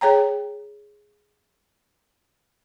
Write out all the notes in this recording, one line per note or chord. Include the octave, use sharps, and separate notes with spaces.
G#4 C#5 G5 A#5